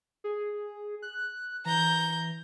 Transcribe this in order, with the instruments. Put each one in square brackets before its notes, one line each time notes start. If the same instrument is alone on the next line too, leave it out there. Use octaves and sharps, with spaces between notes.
[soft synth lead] G#4
F#6
[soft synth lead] E3 [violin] A#5 G6